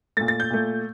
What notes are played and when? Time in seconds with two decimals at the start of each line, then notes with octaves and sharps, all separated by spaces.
0.17 A#2 A3 A6
0.28 A6
0.40 G6
0.50 A#2 A3